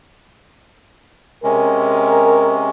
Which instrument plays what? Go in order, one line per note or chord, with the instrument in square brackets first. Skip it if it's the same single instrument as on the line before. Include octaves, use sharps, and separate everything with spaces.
[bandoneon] C3 G#3 C#4 [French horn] A#4